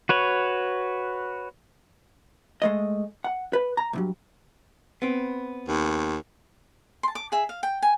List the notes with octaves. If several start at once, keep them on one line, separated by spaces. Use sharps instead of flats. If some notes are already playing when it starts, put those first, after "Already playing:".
F#4 B4 C#5
G#3 A3 D#5
F#5
B4
A#5
C2 G2 F#3
B3 C4
D#2
A5 C6
D6
G#4 E5
F5
G5
G#5